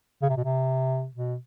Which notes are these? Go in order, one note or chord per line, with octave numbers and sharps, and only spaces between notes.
C#3
C3
B2
C3
B2